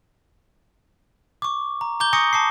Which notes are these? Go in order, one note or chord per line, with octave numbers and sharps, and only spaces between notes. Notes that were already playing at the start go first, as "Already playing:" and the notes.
C#6 D6
A#5
A#5 D6 G6 G7
G#5 C#6 D#6 A#6 C#7
A5 D6 C7